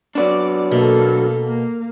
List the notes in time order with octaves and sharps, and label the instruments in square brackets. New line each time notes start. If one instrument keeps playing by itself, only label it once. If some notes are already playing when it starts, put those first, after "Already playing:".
[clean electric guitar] F#3 B3 D4 [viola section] D5
[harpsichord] B2 [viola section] A#3 A4
[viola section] A#3